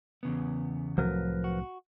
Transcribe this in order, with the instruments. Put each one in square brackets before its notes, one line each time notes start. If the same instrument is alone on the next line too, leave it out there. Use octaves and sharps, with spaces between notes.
[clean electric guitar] E2 C#3 B3
[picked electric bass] C2 A2 F#3 [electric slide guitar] F3 A#4 B4
[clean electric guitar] F#4